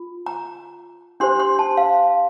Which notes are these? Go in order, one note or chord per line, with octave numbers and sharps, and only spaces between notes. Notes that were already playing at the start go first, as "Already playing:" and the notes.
Already playing: F4
A#5
D4 G4 C5 C6
C6
A5
F5